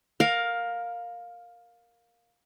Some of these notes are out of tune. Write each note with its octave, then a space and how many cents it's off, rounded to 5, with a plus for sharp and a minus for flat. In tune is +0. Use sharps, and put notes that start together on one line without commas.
A#4 +0 F5 +15